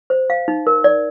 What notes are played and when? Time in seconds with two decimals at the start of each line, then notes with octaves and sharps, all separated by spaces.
0.10 C5
0.30 F5
0.48 D#4
0.67 A#4
0.84 D5